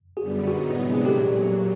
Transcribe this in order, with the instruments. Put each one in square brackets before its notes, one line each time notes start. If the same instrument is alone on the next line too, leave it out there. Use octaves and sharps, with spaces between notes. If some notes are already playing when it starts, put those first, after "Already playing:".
[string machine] F#2 D3 G3 B3 [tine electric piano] F#4 G#4
[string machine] A2 F#3 B3 D#4 [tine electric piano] F#4 G#4
[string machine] C3 E3 G#3 B3 D4
[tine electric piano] G#4
[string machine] A#2 F#3 [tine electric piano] G4 A4